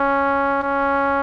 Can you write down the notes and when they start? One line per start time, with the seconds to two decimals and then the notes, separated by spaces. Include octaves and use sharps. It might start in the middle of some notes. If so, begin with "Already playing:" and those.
Already playing: C#4
0.63 C#4